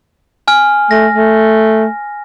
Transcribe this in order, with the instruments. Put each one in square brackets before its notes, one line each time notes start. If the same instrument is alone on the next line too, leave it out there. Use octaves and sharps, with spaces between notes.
[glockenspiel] G#5 F6
[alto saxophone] A3 [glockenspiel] A#6
[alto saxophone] A3